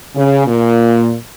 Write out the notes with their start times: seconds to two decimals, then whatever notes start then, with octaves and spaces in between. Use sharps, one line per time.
0.15 C#3
0.47 A#2